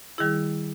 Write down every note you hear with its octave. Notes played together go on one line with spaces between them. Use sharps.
D#3 G3 E4 G#4